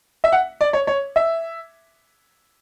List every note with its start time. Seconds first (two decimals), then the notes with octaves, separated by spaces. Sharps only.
0.24 E5
0.32 F#5
0.61 D5
0.73 C#5
0.87 C#5
1.16 E5